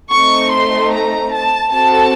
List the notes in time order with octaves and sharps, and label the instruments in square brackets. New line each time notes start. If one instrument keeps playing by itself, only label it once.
[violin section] A3 C4 D#4 C#6
C6
A#5
A5
C4 F#4 A4 A5